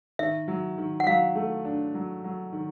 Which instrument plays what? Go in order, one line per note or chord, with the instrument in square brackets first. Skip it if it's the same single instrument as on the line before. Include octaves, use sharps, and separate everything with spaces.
[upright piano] D#3 [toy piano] E5
[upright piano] F#3
D#3
[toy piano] F#5
[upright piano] F#3 [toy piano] F5
[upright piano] A3
D4
F#3
F#3
D#3